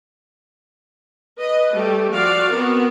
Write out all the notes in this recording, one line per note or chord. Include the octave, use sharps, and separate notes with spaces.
B4 D#5
G3 A3 G4
F3 F#4 D5 F5
B3 C4 F#4 A#4